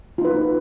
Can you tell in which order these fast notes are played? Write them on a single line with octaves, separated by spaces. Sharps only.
F4 D#4 B4